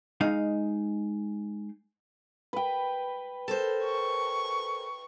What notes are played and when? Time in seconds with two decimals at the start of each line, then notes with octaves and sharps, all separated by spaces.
0.21 G#3 D#4 F5
2.53 B4 G5
3.48 A4 A#4 C5
3.83 C#6